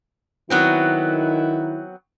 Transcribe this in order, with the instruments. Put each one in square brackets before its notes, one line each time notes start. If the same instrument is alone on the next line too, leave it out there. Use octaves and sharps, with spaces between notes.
[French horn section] D#3 E4 [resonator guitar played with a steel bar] F#3 B3 C4